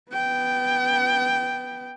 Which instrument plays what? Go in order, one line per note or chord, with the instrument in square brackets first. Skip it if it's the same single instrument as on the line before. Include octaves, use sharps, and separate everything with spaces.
[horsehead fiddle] B3 G5